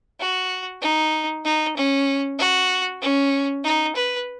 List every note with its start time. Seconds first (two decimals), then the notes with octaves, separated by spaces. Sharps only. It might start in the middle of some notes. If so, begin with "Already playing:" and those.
0.20 F#4
0.82 D#4
1.45 D#4
1.76 C#4
2.39 F#4
3.01 C#4
3.64 D#4
3.96 B4